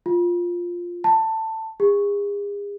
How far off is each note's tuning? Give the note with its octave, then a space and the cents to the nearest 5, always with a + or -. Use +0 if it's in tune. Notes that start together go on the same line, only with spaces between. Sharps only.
F4 +5
A5 +15
G#4 -40